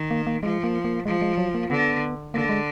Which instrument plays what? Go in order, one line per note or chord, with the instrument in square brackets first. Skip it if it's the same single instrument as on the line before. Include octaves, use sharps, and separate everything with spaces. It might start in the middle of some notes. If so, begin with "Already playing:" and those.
Already playing: [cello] D#3
[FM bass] A#3
A#3
[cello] F3 [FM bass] G#3
[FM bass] A#3
A#3
[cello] F3 [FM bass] G#3
[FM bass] G#3
F#3
A#3
[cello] D3 [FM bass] B3
[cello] D3 [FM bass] A#3
[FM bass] G#3